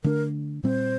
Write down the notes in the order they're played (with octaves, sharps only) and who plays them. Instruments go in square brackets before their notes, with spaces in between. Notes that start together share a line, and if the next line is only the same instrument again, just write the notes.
[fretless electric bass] D3 A3 D4 [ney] A#4
[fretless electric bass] A#2 G3 C4 [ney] C5